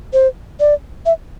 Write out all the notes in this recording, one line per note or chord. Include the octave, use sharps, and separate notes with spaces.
C5
D5
E5